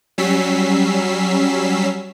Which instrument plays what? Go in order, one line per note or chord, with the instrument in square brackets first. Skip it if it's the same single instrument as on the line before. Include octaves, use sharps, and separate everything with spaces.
[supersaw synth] F#3 G3 C#4 E6 B6 C7